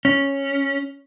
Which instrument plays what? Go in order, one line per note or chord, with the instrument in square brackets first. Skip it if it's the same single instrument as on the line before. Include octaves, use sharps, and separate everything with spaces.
[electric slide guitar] C#4